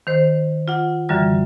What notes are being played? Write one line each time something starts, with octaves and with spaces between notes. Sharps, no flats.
D#3 C5
F4 F#5
F#2 D3 E3 G3 F6